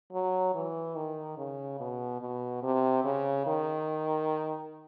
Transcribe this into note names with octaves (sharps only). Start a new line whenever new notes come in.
F#3
E3
D#3
C#3
B2
B2
C3
C#3
D#3